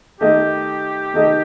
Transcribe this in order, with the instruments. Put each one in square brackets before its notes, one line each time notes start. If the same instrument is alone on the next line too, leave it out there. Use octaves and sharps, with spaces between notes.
[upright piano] D#3 A3 D#4 A4 D#5 [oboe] G4
[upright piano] D#3 A3 D#4 A4 D#5